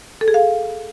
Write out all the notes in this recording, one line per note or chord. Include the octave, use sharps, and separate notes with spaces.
A4
G#4
F5